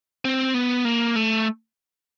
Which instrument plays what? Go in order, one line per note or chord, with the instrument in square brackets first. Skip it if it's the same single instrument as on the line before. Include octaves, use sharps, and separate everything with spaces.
[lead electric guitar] C4
B3
A#3
A3